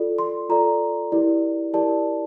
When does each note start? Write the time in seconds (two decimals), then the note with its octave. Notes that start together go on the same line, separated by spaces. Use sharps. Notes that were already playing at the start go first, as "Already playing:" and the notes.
Already playing: F4 A4 D5
0.19 C6
0.49 F4 A4 D5 A#5
1.12 E4 G4 A#4 D5
1.73 E4 G4 A#4 D5 A5